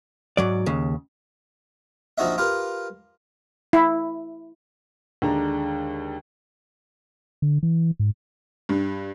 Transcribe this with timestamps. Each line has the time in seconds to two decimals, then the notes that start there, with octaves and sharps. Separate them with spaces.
0.37 G#2 F#3 D5
0.66 D#2 C#3
2.18 A#1 F3 D#4 F#4 D#5 E5
2.38 F4 G4 A#4 B4
3.73 E4
5.22 D#2 D3 G#3 D4 A#5
7.42 D3
7.63 E3
8.00 G#2
8.69 G2